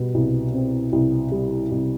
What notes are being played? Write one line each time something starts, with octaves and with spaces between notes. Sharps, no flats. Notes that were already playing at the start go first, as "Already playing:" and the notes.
Already playing: B2 G3
C2
C4
C2
G3
C2